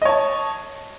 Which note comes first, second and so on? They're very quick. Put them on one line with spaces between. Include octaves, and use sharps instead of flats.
D#5 C#5 A5